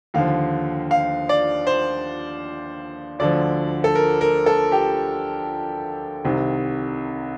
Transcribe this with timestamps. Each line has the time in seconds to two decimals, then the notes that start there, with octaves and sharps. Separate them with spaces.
0.14 D#2 D3 F3 F5
0.91 F5
1.29 D5
1.67 C5
3.19 D2 D3 F3 D5
3.84 A4
3.95 A#4
4.21 A#4
4.46 A4
4.72 G4
6.25 C2 C3 D#3